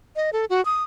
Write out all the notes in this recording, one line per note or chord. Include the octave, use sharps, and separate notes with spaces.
D#5
A4
F#4
D#6